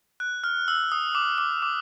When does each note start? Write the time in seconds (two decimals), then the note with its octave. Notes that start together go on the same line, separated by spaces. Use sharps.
0.20 F#6
0.44 F6
0.68 E6
0.92 D#6
1.15 D6
1.38 D6
1.62 D6